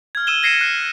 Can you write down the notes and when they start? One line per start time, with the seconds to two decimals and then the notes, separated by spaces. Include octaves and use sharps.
0.15 F6 G#6
0.27 E6 D#7 E7 G7
0.43 G#6 A#6 C7 C#7 D#7 E7
0.61 F#6